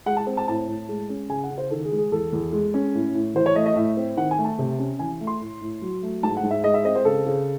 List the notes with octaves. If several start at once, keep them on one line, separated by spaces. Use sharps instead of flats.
G#3 F#5
A5
C4
A5
A2 A5
A2
G#3
C#4
C#3 G#5
F#5
C#3
C5
D#3 A4
G#4
G#3
G#4
E2 A4
E2
G#3
C#4
A2
A2
E3 C5
C#5
A3 D#5
D#5
A2 E5
C4
D#3 F#5
G#5
A3
A5
C3
C#4
E3 G#5
A3
C6
A2
A2
F#3
A3
G#2 A5
F#5
G#2
E5
G#3 D#5
E5
C4 D#5
C5
C#3 A4
C#3